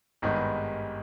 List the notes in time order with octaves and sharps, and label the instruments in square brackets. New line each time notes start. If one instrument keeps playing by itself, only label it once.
[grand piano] G#1 G2 D#3 G#3 B3